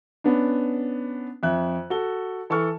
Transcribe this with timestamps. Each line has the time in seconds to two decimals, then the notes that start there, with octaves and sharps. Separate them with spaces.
0.24 B3 C#4 D4
1.43 F2 E5 F#6
1.90 F#4 A4 G7
2.50 E3 A4 A5 C#6 F6